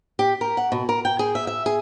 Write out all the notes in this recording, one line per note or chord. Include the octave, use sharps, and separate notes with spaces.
G4
A#4
F#5
B2
A#4
G5
G#4
E5
E5
G#4